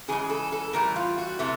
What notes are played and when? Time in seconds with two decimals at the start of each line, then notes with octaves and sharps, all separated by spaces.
0.08 C#3 E3 G#3 G#4
0.29 A4
0.52 A4
0.73 A2 E3 G3 A#4
0.96 F4
1.18 F#4
1.39 C3 E3 A3